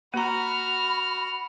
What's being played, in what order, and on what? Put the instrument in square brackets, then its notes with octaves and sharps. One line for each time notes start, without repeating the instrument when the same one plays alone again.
[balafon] A#3 A#5 [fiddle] F#4 F6 [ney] B5